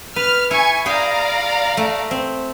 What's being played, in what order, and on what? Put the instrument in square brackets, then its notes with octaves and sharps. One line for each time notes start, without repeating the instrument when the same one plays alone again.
[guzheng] B4 [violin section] F6
[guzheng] E4 [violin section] G#5 C#6
[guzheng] G#4 G5 [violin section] D5 F5 A#5
[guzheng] A3
C4